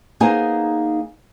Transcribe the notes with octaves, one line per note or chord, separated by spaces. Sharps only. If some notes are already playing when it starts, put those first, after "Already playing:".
A#3 B3 D#4 G#4 C5 G#5